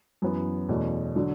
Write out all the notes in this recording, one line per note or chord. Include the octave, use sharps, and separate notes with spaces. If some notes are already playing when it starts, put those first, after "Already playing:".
F#2 E3 B3
E2 B2 A3 C#4
D3 F#3